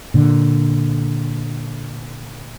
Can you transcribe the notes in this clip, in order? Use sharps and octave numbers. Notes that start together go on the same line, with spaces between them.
A#2 D3